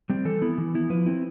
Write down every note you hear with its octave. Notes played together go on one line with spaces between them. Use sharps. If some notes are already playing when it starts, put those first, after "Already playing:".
G3 C4
E3 A4
B3 E4
E3
B3 E4
F3 B4
C4 E4